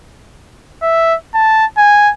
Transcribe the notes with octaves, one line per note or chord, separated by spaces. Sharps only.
E5
A5
G#5